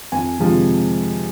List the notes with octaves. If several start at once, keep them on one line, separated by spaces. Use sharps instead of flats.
F2 G#5
C3 F3 G#3